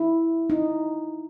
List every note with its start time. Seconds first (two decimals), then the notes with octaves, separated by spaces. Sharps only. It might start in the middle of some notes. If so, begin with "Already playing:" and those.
Already playing: E4
0.50 D#4